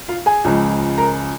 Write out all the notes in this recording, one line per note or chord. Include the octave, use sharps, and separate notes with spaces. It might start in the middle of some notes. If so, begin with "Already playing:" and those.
F4 F5
G#4 G#5
C#2 C#3 F3 G#3
A#4 A#5